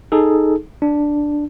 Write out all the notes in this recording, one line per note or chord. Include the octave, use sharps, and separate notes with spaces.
D#4 G#4 A4
D4